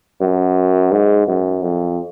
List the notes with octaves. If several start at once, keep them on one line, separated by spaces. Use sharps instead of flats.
F#2
G#2
F#2
F2